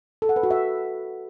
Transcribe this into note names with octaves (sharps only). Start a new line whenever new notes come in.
A4
F#5
B4
F#4
E5